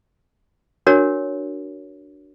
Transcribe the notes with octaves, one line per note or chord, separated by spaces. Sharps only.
D4 F#4 A#4 C#5